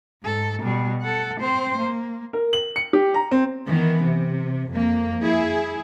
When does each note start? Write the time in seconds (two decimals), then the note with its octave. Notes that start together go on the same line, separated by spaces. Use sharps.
0.23 G#2 A4
0.62 B2 G3
1.01 A4 F#5
1.40 C4 C5
1.78 A#3
2.33 A#4
2.53 F#7
2.76 C#7
2.93 G4
3.14 A#5
3.31 C4
3.67 D#3 E3 B3
4.03 C3
4.71 F2 A#3
5.23 E4 G#4